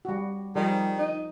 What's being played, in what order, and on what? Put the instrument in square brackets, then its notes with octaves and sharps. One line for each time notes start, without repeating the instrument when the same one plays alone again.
[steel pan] G3 F#4
[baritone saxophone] D#3 [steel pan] F3 G#4 [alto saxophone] G3
[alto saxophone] D#4